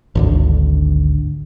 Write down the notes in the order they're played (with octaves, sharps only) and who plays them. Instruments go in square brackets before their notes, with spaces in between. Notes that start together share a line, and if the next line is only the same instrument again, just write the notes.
[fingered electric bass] G#1 D2 D3